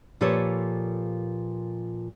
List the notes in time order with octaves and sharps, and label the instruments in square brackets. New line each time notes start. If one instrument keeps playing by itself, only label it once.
[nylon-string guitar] A#2 F3 G4 A4 B4 C#5